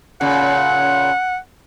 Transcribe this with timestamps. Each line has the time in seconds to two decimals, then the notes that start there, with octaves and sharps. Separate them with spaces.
0.21 A#2 C#3 F#5